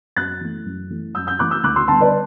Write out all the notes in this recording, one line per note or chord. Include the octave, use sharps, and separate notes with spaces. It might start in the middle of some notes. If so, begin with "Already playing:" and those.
F#2 F#6 A6
E3 A3
F#2
E3 A3
F#2 E6 G6
E6 G6
E3 A3 D6 F#6
E6 G6
D2 D6 F#6
C6 E6
D3 G3 B3 A5 C6
B4 D5